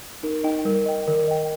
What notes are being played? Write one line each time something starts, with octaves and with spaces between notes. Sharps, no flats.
D#4 A#4
D#4 D#5 G5
G3 A#4
D#5 G5
D#3 A#4
D#5 G5